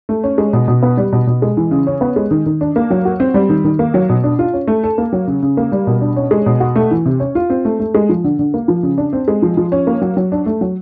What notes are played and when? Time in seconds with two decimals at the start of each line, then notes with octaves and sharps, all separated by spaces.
0.09 A3
0.24 C#4
0.38 G#3
0.53 B2
0.68 B2
0.83 B3
0.97 G3
1.13 B2
1.27 B2
1.42 G#3
1.57 E3
1.71 C#3
1.87 C#4
2.01 B3
2.16 G#3
2.31 D#3
2.46 D#3
2.61 D4
2.76 A#3
2.91 F#3
3.05 F#4
3.20 C4
3.34 G3
3.49 D#3
3.65 D#3
3.79 A#3
3.94 F#3
4.09 B2
4.24 D4
4.39 F4
4.53 C#4
4.68 A3
4.84 A4
4.98 A#3
5.13 F#3
5.27 C#3
5.43 C#3
5.57 A#3
5.72 G3
5.87 B2
6.01 D4
6.16 C#4
6.31 G#3
6.46 B2
6.60 F#4
6.76 A3
6.91 E3
7.06 C3
7.20 C#4
7.35 F4
7.50 C4
7.65 A3
7.80 A3
7.95 G#3
8.09 F3
8.24 D3
8.39 D3
8.54 A#3
8.68 F3
8.83 C#3
8.98 D4
9.13 C4
9.28 G#3
9.42 F3
9.57 F3
9.72 C#4
9.87 A#3
10.02 F#3
10.17 F#3
10.32 D4
10.46 A3
10.61 F#3